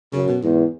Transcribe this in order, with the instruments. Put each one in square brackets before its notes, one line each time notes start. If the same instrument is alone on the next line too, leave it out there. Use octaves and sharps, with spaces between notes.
[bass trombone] F#2 [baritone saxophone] C#3
[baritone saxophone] B2
[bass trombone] E2 [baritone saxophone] G#2